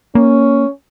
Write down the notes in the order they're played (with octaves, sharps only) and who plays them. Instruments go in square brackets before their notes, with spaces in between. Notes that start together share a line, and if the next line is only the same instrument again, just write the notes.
[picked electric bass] A#3 [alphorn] C#4